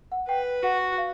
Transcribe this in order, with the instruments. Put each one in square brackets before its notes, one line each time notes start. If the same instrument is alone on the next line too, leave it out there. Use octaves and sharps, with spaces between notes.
[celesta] F#5
[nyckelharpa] B4 [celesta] G5
[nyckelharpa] F#4 [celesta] F#5
[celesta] F5